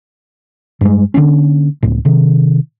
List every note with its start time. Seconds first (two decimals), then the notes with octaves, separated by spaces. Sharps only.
0.81 G2 G3 G#3
1.14 D3 F#3 A#3 C#4
1.83 C#2 A2
2.05 C3 D#3